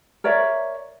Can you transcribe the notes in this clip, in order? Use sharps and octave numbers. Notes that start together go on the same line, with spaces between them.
A#4 C#5 D5 E5